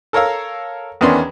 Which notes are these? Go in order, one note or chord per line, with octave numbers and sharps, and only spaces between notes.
A4 A#4 C#5 F5 E6
E2 D#3 B3 C#4 D4 C6